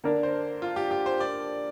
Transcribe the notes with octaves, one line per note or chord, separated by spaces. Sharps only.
D3 A#3 D4 A#4
C5
F4
G4
G4
C5
D5